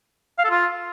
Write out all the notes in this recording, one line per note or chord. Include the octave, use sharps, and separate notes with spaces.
F5
A4
F4